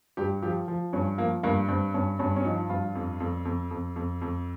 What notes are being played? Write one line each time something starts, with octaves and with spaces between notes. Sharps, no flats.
G2 G4
F3 G4
F3
G2 C#4
F3 A#3
G2 A#3
G2 C4
G2 C#4
G2 C#4
C#4
F3 D#4
G2 F4
F2
F2
F2
F2
F2
F2